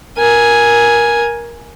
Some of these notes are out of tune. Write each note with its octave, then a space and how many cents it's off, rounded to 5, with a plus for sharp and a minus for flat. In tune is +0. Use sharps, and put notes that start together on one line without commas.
A#4 +15 G#5 +0